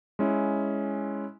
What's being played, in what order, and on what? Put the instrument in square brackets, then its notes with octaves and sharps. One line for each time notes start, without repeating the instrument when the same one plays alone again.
[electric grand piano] G#3 C#4 E4